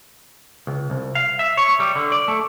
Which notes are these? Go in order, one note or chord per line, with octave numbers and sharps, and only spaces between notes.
C#2
C2
F5
E5
C#5
G3
D3
D5
A3